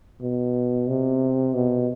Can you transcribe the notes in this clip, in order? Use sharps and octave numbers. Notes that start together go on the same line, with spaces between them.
B2
C3
B2